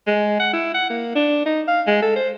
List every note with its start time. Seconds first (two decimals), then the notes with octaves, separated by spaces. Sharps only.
0.07 G#3
0.40 F#5
0.53 E4
0.74 F#5
0.90 A#3
1.15 D4
1.46 D#4
1.68 F5
1.87 G#3
2.02 A4
2.16 C5